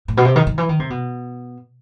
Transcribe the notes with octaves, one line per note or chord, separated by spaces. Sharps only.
A2
B2
C3
D#3
D#3
E3
D#3
C3
B2